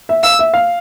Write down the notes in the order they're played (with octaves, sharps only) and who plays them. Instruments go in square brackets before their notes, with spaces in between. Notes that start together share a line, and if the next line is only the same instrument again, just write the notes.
[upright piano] E5
[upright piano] F5 [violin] E6
[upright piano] E5
F5